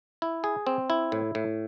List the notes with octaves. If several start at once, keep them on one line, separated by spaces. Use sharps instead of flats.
E4
G#4
C4
E4
A2
A2